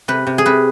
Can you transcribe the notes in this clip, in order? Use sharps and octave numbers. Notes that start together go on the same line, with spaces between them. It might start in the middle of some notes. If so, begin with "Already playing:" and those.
C3 B4
C3
G#4
C3 B4